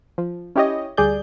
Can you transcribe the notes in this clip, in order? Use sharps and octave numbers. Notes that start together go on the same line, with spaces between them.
F3
C#4 E4 G4 C#5 D#5
D2 G3 G#4 D5 G6